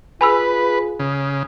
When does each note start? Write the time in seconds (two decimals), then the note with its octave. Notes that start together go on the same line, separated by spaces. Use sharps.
0.21 F4 G#4 B4 G#5 B5 E6
0.99 C#3